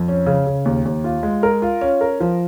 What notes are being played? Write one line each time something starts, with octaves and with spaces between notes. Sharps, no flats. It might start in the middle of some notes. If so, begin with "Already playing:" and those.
Already playing: F2
C#4
C#3
C#3
D#2
D#2
F4
G#3
A#4
F4
C#4
A#4
F3